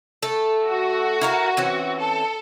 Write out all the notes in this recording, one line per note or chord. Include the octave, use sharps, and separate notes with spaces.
A3 A4
F#4
E4 A#4 F5
E3 C4 C#4
A4